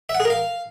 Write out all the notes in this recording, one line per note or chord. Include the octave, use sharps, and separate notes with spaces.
E5
F#5
G#4
A#4
F5